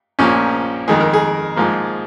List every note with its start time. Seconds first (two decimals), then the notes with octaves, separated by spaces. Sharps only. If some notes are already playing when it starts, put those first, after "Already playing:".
0.19 A#1 A#2 F3 A#3 C#4
0.88 F2 D#3 G#3 G#4
1.01 A#4
1.14 G#4
1.56 G#2 F3 A#3